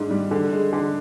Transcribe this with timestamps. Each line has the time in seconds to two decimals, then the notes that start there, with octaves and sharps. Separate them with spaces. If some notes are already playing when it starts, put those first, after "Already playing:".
Already playing: G#2 D4
0.10 G3
0.31 D3
0.53 G#3
0.73 D3